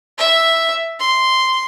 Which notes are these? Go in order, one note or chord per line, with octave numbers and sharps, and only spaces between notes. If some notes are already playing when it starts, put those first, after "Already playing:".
E5
C6